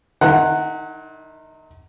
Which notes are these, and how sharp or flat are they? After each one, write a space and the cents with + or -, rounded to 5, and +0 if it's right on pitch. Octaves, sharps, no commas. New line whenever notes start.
D#3 -30 D#4 +45 F#5 +0